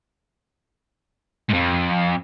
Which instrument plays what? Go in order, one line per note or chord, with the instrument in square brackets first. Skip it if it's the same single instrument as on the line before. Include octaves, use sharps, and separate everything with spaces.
[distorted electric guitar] F2 G#2